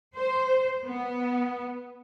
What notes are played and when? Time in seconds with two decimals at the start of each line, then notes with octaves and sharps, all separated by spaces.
0.16 C5
0.85 B3